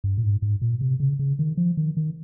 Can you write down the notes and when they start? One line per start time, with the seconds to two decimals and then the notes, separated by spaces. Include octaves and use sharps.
0.04 G2
0.17 A#2
0.23 G#2
0.42 G#2
0.62 A#2
0.81 C3
1.00 C#3
1.19 C#3
1.39 D#3
1.57 F3
1.77 D#3
1.97 D#3